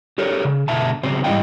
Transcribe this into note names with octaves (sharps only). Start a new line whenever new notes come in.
G4 A4 A#4 C#5
C#3
B2 D3 E5 A5
C#3 F#3 C4 C5
G#2 G3 E4 D#5 F5 G5